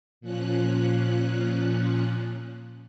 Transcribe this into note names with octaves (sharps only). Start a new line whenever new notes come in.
A#2 F3 C#4 F#6